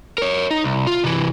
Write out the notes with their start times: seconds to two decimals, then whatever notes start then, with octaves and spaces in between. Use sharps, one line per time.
0.18 A#4 C#5
0.51 D#4
0.64 C2
0.87 F4
1.04 C3 E3